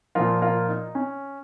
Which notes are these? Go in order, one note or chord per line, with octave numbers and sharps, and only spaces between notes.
A#2 F3 F4 A#4
F4 A#4
D#4
C#4